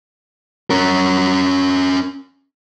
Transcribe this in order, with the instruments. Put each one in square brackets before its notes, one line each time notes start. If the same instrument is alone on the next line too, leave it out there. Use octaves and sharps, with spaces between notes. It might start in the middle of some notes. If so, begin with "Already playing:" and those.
[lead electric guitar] C#4 A#4